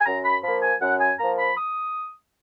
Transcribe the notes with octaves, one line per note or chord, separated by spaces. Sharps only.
G#5
F#2 A#5
B5
F3 A#3 B5
G#5
F#2 F#5
G#5
F3 A#3 A#5
B5
D#6